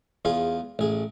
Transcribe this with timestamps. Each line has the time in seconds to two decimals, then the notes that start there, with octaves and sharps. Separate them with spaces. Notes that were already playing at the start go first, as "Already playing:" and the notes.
0.25 E2 F4 G#4 F5
0.79 A1 G#4